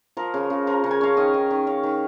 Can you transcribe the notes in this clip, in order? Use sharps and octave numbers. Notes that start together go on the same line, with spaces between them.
F3 A#4
C#3
C#3
F3 A#4
C#3
G#5
C#4 F5
D#3 D#5
D#3
D#3
C#4 F5
D#3